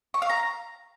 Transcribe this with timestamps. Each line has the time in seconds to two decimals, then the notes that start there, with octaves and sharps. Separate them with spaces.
0.14 C#6
0.22 F5
0.30 A#5